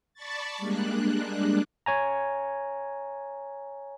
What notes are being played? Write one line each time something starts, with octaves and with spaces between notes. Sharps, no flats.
D5 A5 B5 C#6 A6
G3 G#3 A#3 D4 F#6
C#5 G#5 A#5